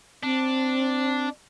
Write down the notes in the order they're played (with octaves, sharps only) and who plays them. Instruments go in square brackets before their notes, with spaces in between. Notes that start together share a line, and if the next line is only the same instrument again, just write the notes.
[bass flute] C4 [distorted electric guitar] D4